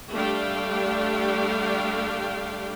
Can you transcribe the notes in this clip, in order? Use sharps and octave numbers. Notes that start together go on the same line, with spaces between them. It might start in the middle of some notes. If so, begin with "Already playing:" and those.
G3 A3 D4 F5 G5